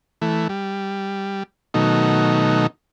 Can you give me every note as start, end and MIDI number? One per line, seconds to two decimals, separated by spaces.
0.22 0.48 52
0.22 0.48 57
0.49 1.43 55
1.74 2.67 47
1.74 2.67 51
1.74 2.67 54
1.74 2.67 57
1.74 2.67 63